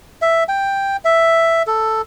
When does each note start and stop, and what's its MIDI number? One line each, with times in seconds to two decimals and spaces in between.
0.22 0.44 76
0.49 0.97 79
1.05 1.62 76
1.67 2.02 69